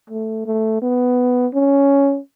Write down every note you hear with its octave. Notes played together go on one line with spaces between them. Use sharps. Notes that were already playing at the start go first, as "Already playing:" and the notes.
A3
A3
B3
C#4